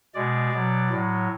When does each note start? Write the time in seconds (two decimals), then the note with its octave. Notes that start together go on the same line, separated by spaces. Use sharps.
0.14 B2 G#3 D5
0.52 B2 F#3
0.90 A2 F#3